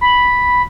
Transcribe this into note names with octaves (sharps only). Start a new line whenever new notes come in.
B5